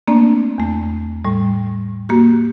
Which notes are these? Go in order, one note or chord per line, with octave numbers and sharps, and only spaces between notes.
A3 A#3 C4 D4 D5
E2 A3
A2 G3
A#3 F#4 G4